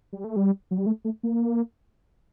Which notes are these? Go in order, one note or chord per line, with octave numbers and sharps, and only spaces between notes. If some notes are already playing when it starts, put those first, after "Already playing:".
G3
A3
G3
F#3
G3
A3
A3
A#3